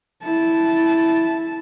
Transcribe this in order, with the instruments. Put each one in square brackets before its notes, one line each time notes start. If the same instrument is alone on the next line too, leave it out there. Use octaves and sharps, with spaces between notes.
[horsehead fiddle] E4 A5